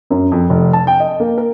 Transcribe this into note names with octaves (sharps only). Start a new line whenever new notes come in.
F#2
F2
F1
A5
G5
D#5
A#3
A#4